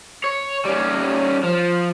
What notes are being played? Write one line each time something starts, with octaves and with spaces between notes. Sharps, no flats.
C#5
G3 C#4
F3